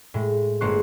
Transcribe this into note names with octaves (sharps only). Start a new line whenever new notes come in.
A2 G#3
G1 G#3 A#3 C5 C#6 F#6